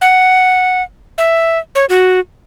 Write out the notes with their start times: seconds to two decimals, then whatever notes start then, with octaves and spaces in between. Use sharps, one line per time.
0.01 F#5
1.18 E5
1.75 C#5
1.89 F#4